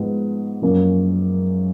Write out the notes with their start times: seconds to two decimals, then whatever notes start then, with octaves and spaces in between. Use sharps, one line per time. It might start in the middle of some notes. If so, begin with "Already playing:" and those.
Already playing: G#2 F3 G#3 B3
0.62 F#2 F3 A#3 C#4